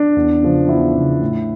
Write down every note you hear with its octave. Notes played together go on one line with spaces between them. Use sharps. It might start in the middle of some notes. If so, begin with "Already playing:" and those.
Already playing: D4
E2
C#3 F3
E2 E4
C#3 F3
A2